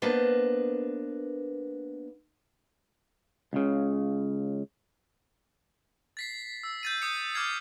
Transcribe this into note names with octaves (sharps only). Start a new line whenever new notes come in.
A#3 B3 D4 B4 C5 D#5
C#2 C#3
A6 B6 C7
E6
G6 A6 D#7
D#6 C#7
D6 F6 G#6 C7